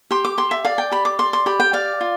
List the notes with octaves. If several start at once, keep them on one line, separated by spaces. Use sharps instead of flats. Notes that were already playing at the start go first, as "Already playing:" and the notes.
G4 C6
D6
G4 C6
E5
D5 F5
G5
G4 B5
D6
D5 C6
C6
G4 B5
G5
D5 F5
F4